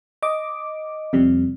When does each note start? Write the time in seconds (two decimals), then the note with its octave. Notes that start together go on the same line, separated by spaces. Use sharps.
0.22 D#5 D6
1.13 F2 C3 G3